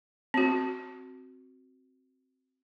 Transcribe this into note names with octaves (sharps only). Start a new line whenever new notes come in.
C4 F#4